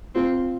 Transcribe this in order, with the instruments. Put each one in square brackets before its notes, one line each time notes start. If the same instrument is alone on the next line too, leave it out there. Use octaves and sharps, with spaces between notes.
[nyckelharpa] C4 [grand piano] F4